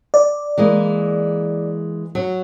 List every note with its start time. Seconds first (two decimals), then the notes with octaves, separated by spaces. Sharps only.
0.14 D5
0.58 E3 G#3 A#3
2.15 F#3